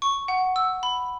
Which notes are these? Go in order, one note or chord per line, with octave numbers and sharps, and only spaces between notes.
C#6
F#5
E6
B5